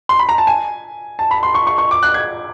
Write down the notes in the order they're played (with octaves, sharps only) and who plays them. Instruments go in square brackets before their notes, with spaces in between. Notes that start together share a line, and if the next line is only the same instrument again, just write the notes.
[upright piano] C6
B5
A#5
A5
G#5
A5
B5
C6
C#6
C#6
C#6
D6
F#6
G#6